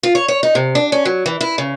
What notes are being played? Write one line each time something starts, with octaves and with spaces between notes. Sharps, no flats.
F4
C#5
C#5
D#4
C3
D4
C#4
F#3
E3
E4
C#3